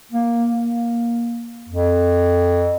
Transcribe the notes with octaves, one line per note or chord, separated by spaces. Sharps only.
A#3
A#3
F2